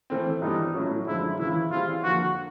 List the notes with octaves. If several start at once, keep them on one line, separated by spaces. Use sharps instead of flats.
E3 A3 C4
G2 E3 G3 B3 D#4 E4
A2 F#3 A3 C#4 F#4
F#2 D3 F3 G#3 E4
E2 C#3 E3 E4
E3 G3 C4 E4 F4 G#4
F2 D3 F3 A#3 F#4